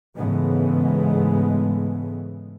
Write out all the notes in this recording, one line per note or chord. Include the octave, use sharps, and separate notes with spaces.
G#2 C#3 E3 G#3 A3 B3